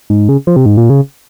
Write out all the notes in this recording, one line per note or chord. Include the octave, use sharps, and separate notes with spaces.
G#2
C#3
F3
C3
G#2
A#2
C#3